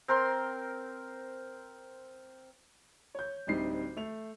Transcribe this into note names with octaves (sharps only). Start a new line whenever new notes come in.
C4 A#4 C5 C6
C#5 G6
D1 D2 G3 C4 D#4 C7
A3 F7